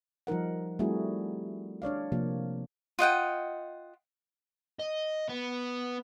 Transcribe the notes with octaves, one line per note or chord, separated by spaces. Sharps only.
F3 G3 D#4 A#4 F#5
G3 A3 C4 E4 F#4 G#4
D4 C#5 D5 F5
C3 F3 A#3
F4 D#5 F#5 G5
D#5
B3